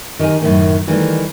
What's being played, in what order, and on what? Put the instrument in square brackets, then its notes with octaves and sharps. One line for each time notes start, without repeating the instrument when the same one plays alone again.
[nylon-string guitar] D#3 G4 A#4 G#5
F#2 A2 D#3
D#3 E3 G3 A3 D#4